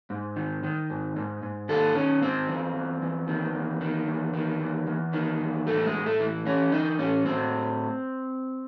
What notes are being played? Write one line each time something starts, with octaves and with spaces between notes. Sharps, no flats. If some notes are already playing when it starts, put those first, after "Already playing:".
G#2
D#3
D#3
G#2
G#2
G#2
D#3 A4
D#3 C#4
G#2 C4
E2
E2
E2
D#3
E2
D#3
E2
D#3
E2
E2
D#3
E2
A2 A3
G#3
A2
A3
E3
E3 C#4
E3 D#4
A2 C#4
A2 C4